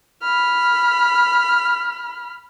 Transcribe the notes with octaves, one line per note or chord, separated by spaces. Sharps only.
B5 F6